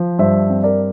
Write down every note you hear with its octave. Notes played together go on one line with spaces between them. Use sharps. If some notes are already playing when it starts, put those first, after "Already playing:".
Already playing: F3
G2 C5 E5
C4
A#4 D5